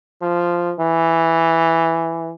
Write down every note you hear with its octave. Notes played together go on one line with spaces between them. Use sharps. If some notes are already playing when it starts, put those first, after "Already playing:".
F3
E3